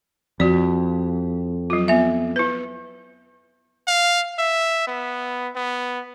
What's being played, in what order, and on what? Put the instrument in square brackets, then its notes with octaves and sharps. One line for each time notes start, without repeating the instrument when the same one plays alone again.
[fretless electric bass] F2 [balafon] F#4 D5
[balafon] F#3 F4
B3 E5
E4 B4
[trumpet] F5
E5
B3
B3